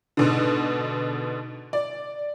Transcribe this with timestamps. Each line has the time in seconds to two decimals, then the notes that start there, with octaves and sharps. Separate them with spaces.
0.17 G#2 B2 D3
1.73 D5